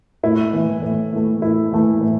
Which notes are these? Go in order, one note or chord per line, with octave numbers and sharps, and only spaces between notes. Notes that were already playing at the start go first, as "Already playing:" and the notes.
A2 E4
E3 A3
A2
E3 A3
A2 E4
E3 A3
A2